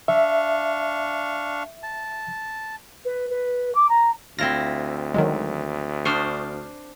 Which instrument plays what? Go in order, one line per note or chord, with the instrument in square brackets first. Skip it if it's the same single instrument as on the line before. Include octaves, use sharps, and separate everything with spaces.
[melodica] D4 F5 C#6 [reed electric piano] E5
[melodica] A5
[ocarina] B4
B4
D6
A#5
[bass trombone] D2 [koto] C4 E4 F4 [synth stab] A#6
[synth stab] D#3 F#3 G#3
[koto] D4 C5 [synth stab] C#6 D#6 F6